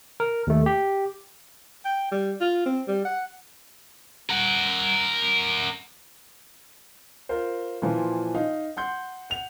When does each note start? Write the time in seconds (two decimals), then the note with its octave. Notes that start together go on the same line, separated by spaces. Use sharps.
0.20 A#4
0.47 D#2 A3
0.66 G4
1.85 G5
2.12 G3
2.41 F4
2.66 C4
2.88 G3
3.05 F#5
4.30 A#4 F#5
7.29 F4 A#4 C5
7.82 A#2 E3 F3
8.35 D#4 F5
8.77 F#5 C6 G6
9.30 F#5 F7